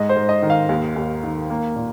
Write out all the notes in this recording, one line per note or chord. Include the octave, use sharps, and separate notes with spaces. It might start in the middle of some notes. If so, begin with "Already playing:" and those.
Already playing: G#2 D#5
C5
G#2
D#5
D#3
F5
D#2
D#2
D#3
A#3
A#2